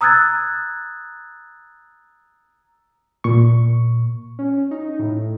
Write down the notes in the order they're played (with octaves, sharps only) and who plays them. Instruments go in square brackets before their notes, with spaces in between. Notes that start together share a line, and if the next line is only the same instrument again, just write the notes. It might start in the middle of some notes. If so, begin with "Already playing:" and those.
[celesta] A#5 D#6 E6 F#6 G#6 A6
[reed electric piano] A#2 C#6
[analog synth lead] C#4
D#4
A2